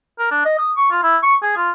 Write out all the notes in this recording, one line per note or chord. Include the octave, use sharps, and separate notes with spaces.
A#4
D4
D#5
D#6
C#6
F4
E4
C#6
G#4
F4